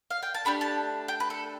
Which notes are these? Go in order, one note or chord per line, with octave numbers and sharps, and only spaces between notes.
F5
G5
A5
A3 D4 G4 B5
A5
G5
B4
A4